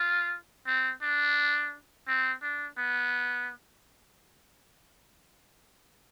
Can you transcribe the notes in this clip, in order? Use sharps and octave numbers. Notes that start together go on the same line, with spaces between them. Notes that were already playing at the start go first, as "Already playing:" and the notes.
Already playing: F4
C4
D4
C4
D4
B3